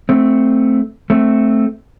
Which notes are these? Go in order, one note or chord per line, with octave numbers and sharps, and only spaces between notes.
A3 C4
A3 C4